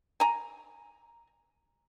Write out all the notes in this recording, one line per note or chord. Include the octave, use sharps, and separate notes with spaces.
G#5 A#5